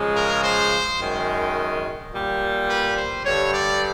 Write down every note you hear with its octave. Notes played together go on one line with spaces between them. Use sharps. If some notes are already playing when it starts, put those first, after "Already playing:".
Already playing: C#3 F3 G#3
A#4
C5
F#2 D#3 G#3
A#2 G3
B4
C5
G2 D3 G3 C#5
D5